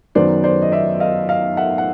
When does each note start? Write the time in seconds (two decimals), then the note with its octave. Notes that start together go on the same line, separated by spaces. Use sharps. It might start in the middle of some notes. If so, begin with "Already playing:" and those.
0.15 F#2 D#3 F#3 B3 C5 D5
0.44 C5 D5
0.62 D#5
0.72 D5 E5
1.00 D#5 F5
1.28 D#5 F5
1.57 E5 F#5
1.78 F#5